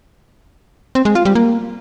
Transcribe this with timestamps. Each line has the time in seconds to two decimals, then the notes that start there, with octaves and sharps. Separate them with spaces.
0.95 C4
1.05 G#3
1.15 F4
1.25 G3
1.35 A#3